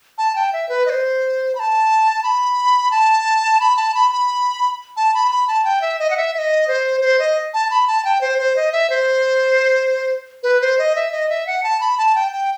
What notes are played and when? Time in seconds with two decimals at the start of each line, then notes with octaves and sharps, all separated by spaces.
0.18 A5
0.36 G5
0.53 E5
0.69 B4
0.86 D#5
0.90 C5
1.55 B5
1.59 A5
2.23 B5
2.91 A5
3.60 B5
3.77 A5
3.94 B5
4.11 B5
4.97 A5
5.14 B5
5.31 B5
5.48 A5
5.65 G5
5.82 E5
5.99 D#5
6.10 F#5
6.17 E5
6.34 E5
6.38 D#5
6.68 C5
7.01 C5
7.19 D#5
7.54 A5
7.71 B5
7.87 A5
8.05 G5
8.21 C5
8.38 C5
8.56 D#5
8.72 E5
8.90 C5
10.43 B4
10.61 C5
10.79 D#5
10.96 E5
11.12 D#5
11.29 E5
11.47 F#5
11.63 A5
11.80 B5
11.98 A5
12.15 G5
12.32 G5